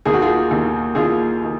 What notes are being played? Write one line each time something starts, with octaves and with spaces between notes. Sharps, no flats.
D#2 D#3 G#4
F#4
F4 G#4
D#2 D#3
D#2 D#3 F4 G#4
D#3